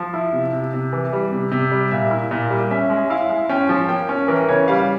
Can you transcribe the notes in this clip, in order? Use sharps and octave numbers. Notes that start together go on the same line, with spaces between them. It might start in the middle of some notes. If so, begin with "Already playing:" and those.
Already playing: F3
E4
C3
C3
C3
E3
G3
C3
C3
G3
A#2 E5
E4
A#2
G3
C#4 E5
G#3
E4 F5
G#3
C#4 G5
F3
A#3 G5
C#4
E3 A#4
C#3 C#5
G3 F5